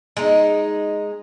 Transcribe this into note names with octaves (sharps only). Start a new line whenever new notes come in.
G#3 D#4